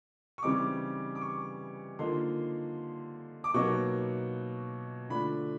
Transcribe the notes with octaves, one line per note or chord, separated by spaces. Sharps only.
C#6
C#3 E3 G3 C4 D#4 D6
D6
C#6
D3 F3 A#3 D#4 C6
D6
B2 F#3 A#3 D#4 C#6
D3 F3 A3 D4 B5